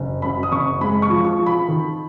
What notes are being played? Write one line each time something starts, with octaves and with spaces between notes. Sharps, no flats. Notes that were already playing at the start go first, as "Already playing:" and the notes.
Already playing: F#1
F#2 B5
D#6
F#1 C#6
G#3 B5
C#6
F3
C#6
F3
B5
D#3